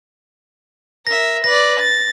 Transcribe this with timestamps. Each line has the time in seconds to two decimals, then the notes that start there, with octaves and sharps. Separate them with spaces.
1.07 A#4 E5 A#6
1.44 B4 D5 A#6
1.80 A6